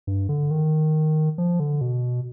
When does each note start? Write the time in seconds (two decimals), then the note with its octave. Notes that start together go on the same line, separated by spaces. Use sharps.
0.07 G2
0.29 D3
0.51 D#3
1.38 F3
1.60 D3
1.81 B2